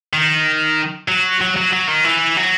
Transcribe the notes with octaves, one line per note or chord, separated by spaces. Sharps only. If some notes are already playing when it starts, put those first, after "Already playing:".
D#3
F#3
F#3
F#3
F#3
D#3
E3
F#3